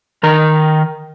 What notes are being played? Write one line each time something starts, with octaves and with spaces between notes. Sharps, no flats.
D#3 A#4 A#5